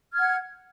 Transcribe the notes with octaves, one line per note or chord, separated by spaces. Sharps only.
F#5 F6 G#6